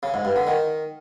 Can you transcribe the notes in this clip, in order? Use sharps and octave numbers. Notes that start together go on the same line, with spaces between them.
C#3
G#2
G2
D3
D#3